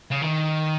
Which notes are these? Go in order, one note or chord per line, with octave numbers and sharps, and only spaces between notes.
C#3
D#3